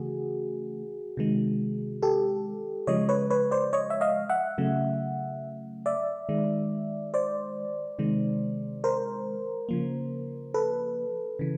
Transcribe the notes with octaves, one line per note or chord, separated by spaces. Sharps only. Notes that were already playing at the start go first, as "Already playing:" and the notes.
Already playing: C#3 E3 A3 F#4 G#4
C3 D#3 G#3
G4 A4
C#3 F3 G#3 C#5 D#5
B4 C#5
B4 C#5
C5 D5
C#5 D#5
E5
D#5 F5
E5 F#5
C#3 F#3 A3
D5 E5
D#3 G#3
C5 D5
C3 D#3 G#3
A#4 C5
C#3 F3 A#3
A4 B4
C#3 E3